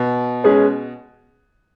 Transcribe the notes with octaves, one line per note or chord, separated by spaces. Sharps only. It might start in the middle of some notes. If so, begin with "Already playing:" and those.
Already playing: B2
G#3 C#4 G#4 B4